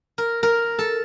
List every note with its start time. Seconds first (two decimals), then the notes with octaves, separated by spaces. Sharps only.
0.18 A#4
0.43 A#4
0.79 A4